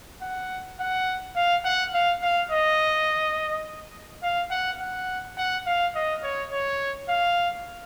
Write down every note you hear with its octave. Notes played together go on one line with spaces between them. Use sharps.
F#5
F#5
F5
F#5
F5
F5
D#5
F5
F#5
F#5
F#5
F5
D#5
C#5
C#5
F5